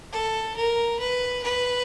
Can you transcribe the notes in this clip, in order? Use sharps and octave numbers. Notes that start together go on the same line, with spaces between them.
A4
A#4
B4
B4